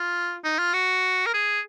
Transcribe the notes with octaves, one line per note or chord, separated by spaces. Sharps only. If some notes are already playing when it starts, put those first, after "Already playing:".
Already playing: F4
D#4
F4
F#4
A#4
G#4